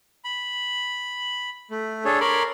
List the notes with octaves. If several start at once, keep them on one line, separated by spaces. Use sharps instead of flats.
B5
A3
D4 G#4 A4 C#5
A#4 C#5 B5 C6 D6